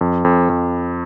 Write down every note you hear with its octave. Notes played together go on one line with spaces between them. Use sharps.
F2
F2
F2